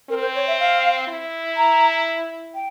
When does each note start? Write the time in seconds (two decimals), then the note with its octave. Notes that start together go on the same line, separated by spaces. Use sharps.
0.10 C4 A#4
0.22 C5
0.35 C#5
0.47 E5
0.59 F5
1.08 E4
1.57 A#5
2.55 G5